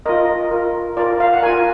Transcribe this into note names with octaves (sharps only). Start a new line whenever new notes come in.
F4 A#4 D#5
F4 A#4
F4 A#4 D5
F5
F#5
F4 A#4 G#5